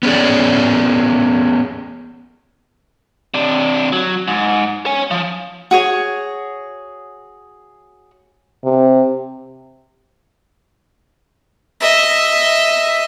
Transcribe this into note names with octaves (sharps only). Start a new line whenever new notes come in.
B3 C#4 G#4 D5
C3 D4
F#3
G#2
C#5 G#5
F3
F#4 G#4 C#5
C3
D#5 E5